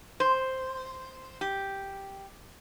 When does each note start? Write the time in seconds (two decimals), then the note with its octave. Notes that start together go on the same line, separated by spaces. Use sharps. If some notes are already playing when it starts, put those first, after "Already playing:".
0.20 C5
1.41 G4